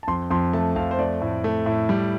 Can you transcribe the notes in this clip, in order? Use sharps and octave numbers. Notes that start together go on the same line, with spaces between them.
A5
F2 C6
F2 C6
A3 A5
F2 F5
C5
A3 D5
A2
A3
A2
G3